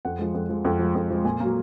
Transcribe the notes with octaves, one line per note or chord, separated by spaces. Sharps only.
F2 F#5
F3 G#3
F2
F3 G#3
F2
F3 G#3
F2
F3 G#3
A#2 G#5
F#3 A#3